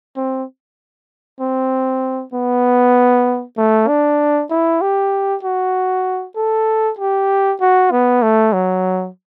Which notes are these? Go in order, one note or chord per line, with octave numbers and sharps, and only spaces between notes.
C4
C4
B3
A3
D4
E4
G4
F#4
A4
G4
F#4
B3
A3
F#3